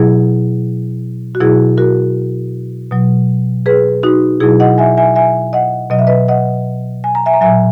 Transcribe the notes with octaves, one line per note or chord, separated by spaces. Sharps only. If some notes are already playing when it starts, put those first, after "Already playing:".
Already playing: B2 F#3 E4 G#4
F#4
B2 F#3 E4 G#4
F#4 A#4
B2 F#3
G#4 B4
D#4 F#4
B2 F#3 E4 G#4
D#5 F#5
E5 G#5
E5 G#5
E5 G#5
D#5 F#5
B2 F#3 D#5
E5
B4 D#5
D#5 F#5
G#5
A#5
E5 G#5
A#5
A#2 F#3 E5 G#5